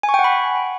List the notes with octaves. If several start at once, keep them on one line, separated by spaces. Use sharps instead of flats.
G#5
C#6
G5
F#5
B5